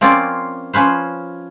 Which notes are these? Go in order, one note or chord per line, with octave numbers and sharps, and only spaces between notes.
F3 A#3 C4 C#4 F4 D5
F3 C#4 B4 C5